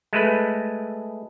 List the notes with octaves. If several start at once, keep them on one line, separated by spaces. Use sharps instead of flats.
G#3 A3 B4